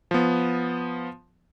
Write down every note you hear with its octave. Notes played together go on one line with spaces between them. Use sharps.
F3 B3